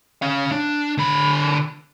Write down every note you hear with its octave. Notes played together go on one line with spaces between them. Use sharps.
C#4 F5
D4
D3 B5